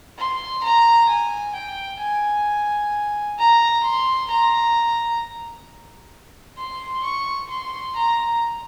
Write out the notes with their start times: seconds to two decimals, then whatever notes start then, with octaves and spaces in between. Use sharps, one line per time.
0.18 C6
0.63 A#5
1.09 G#5
1.55 G5
2.00 G#5
3.38 A#5
3.83 C6
4.30 A#5
6.58 C6
7.03 C#6
7.50 C6
7.96 A#5